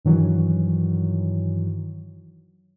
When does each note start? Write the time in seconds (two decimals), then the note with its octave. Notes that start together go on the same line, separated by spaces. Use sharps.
0.05 G2 D#3 E3 F#3